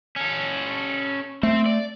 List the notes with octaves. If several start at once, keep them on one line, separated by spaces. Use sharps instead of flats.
C#4 A4
A3 C4
D5